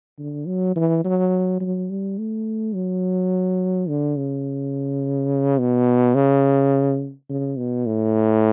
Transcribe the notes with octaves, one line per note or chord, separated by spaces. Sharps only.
D3
F#3
E3
F#3
F#3
G3
A3
F#3
D3
C#3
B2
C#3
C#3
B2
A2